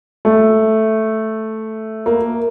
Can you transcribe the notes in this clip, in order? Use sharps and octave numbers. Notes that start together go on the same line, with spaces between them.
A3
A#3